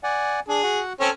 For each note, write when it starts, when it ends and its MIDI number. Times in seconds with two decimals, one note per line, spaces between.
0.03 0.40 74
0.03 0.40 78
0.03 0.40 80
0.48 0.62 62
0.48 0.80 68
0.63 0.93 66
0.63 0.93 78
1.00 1.09 60
1.00 1.09 61
1.00 1.11 69
1.00 1.11 73